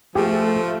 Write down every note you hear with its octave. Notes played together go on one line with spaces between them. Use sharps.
F3 A3 G4 G#4